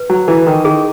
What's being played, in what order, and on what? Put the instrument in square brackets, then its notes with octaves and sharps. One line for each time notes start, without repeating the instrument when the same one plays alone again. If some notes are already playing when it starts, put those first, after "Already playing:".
Already playing: [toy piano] B4
[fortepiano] F#3
[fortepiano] E3 [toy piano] E4
[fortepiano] D#3
[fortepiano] D#3 [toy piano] G#4